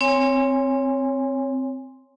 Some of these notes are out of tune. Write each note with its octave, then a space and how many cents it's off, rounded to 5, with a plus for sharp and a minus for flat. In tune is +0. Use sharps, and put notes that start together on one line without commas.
C4 +0 C#5 +0 G#5 -20